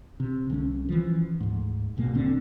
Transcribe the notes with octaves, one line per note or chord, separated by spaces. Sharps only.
C3
C2 D3 G#3 C#4
E3 F3
D2 G#2
D#1 A#1 B2 A#3
E1 D3 C4